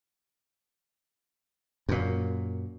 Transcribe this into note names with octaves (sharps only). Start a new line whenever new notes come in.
F#2 A#2